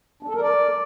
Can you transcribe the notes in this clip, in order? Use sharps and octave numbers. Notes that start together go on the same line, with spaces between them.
D4
A4
A#4
D5